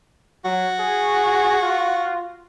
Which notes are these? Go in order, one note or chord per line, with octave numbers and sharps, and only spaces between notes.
F#3 F#4
G#4
F4